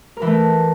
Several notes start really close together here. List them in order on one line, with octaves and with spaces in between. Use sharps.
A#4 E3 A3